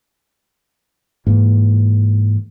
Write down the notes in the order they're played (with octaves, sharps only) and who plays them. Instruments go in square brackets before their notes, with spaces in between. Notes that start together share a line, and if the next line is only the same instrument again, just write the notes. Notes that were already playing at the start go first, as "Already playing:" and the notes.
[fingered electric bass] G#2 E3 A#3